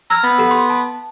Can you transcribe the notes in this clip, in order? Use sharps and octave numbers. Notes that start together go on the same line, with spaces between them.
A#5 E6 F6 G#6
B3
G4 A4 F#5
C6
A5